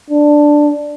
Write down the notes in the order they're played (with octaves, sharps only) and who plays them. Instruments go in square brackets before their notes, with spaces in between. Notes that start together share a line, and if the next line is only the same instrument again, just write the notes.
[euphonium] D4